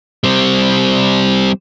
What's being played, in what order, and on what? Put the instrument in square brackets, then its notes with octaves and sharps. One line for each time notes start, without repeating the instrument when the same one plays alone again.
[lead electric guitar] G3 C4